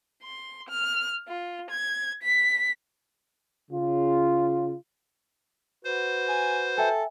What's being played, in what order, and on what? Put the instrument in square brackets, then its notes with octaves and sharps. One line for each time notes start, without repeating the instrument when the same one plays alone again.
[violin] C6
F6
F4
G#6
B6
[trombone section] C#3 F4
[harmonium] F#4 B4 [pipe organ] C5
[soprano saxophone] G#5
[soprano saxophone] A4 [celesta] E5 G5 G#5